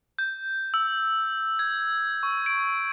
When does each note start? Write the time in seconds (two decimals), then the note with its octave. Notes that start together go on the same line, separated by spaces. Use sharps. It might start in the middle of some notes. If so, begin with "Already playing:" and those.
0.19 G6
0.74 E6
1.59 G#6
2.23 C#6
2.46 D7